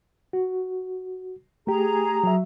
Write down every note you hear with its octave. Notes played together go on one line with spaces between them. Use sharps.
F#4
A3 G4 G#4 A#5
F#3 E5